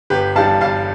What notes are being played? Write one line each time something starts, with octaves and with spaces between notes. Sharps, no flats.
G1 G4 B4
G2 E3 G3 F5 A5
G1 F5 A5